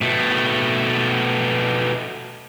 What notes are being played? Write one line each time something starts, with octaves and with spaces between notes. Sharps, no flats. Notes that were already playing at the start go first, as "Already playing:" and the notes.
B2 A3